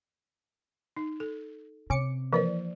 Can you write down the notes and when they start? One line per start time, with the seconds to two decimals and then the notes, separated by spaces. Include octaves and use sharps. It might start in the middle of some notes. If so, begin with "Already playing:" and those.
0.97 D#4
1.20 A4
1.90 C3 C#4 D6 C#7
2.33 E3 F3 A#3 C5 D5